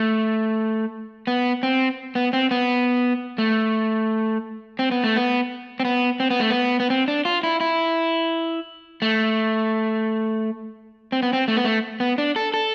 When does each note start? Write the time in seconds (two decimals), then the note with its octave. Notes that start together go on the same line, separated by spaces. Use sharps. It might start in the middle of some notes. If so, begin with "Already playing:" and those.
Already playing: A3
1.27 B3
1.63 C4
2.15 B3
2.33 C4
2.51 B3
3.38 A3
4.79 C4
4.91 B3
5.04 A3
5.16 B3
5.80 C4
5.85 B3
6.20 C4
6.30 B3
6.40 A3
6.50 B3
6.80 B3
6.90 C4
7.08 D4
7.25 F4
7.43 E4
7.60 E4
9.02 A3
11.12 C4
11.22 B3
11.33 C4
11.48 A3
11.56 B3
11.65 A3
12.00 B3
12.18 D4
12.36 A4
12.54 A4